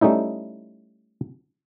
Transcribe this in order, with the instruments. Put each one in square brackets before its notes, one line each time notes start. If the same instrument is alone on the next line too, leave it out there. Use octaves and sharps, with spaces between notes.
[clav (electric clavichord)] G3 A3 C#4 D#4 E4